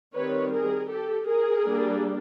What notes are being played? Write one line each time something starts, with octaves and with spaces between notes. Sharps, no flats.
D#3 G3 C4 B4 C#5
G#4 A#4
G4 A4
G#4 A#4
G3 A#3 D4